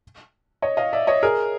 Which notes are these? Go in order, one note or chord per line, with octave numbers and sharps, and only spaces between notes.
C#5 D#5
D#5 F5
D5 E5
C#5 D#5
G#4 A#4